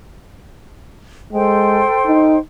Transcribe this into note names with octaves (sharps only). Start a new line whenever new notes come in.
G#3 A4 C5 G5
D#4